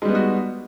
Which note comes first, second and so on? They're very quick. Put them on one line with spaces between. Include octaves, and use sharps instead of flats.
G#3 G3 B3 D#4 F#4